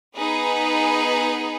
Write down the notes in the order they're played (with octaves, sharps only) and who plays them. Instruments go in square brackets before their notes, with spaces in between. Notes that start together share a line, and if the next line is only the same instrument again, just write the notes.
[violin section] B3 D#4 G#4 B4